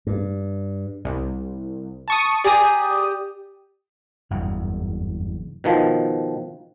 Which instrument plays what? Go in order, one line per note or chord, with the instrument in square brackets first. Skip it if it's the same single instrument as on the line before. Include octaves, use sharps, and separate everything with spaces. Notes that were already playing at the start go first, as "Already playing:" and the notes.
[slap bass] G2
[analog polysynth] C2
A5 C#6 D#6
[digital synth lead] G4 [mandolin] G#4 A#5 [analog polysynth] D5 D#6
[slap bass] F#1 E2 G2
[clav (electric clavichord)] B2 D#3 F3